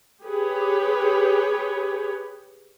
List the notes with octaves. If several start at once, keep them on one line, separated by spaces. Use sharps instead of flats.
G4 G#4 B4 C#5